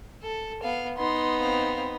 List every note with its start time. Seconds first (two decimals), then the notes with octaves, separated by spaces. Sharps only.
0.22 A4
0.63 B3 F5
0.98 B3 D#4 C6
1.38 C4 F5